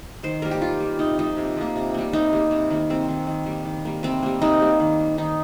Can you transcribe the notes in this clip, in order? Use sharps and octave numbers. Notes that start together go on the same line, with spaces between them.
D#3 C5
G3 A#3 A#4
G4
D#3 F4
G3 A#3
C3 D#4
F3 A#3 D#4
C3
F3 A#3
C3
G3 A#3
C3 D#4
G3 A#3
C3
D#3 A#3
C3 C4
D#3 A#3
D#3
G3 A#3
D#3
G3 A#3
C3 C4
G3 A#3
C3 D#4
G3 A#3
D#3
A#3
D#3 D#4